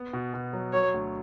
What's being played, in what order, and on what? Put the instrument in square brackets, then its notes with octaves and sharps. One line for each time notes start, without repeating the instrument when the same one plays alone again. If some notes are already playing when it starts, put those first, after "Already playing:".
Already playing: [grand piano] B3
B2
B2
F#3
[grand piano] F#3 [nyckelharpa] C#5
[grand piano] D2